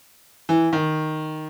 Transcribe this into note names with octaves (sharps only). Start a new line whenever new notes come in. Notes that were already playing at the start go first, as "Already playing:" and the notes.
E3
D#3